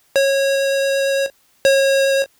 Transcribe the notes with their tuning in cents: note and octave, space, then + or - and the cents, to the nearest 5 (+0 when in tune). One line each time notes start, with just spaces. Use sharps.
C#5 -20
C#5 -30